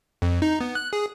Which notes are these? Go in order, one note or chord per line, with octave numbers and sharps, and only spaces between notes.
F2
D#4
B3
F#6
G#4